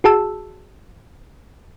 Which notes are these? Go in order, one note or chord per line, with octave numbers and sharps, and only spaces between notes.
F#4 G#4 A5 E6